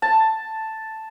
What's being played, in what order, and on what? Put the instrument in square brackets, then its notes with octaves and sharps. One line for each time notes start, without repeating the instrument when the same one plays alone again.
[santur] A5